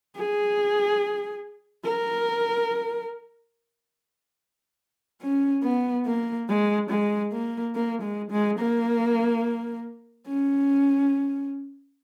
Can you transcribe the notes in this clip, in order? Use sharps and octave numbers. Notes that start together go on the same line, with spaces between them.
G#4
A#4
C#4
B3
A#3
G#3
G#3
A#3
A#3
G#3
G#3
A#3
C#4